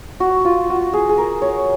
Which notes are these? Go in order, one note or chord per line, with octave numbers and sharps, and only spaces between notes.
F#4
F4
F#4
G#4
G#4
A#4
C#5